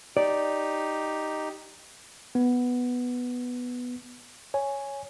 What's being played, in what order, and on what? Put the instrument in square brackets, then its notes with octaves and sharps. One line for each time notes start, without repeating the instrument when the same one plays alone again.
[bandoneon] D#4 G4 [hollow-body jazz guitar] D5
[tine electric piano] B3
C#5 G#5